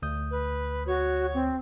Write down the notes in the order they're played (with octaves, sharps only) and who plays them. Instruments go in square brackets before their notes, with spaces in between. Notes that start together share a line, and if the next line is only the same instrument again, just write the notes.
[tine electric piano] D2 D#6 G6
[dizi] B4
[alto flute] F#4 [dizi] C#5
[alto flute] C4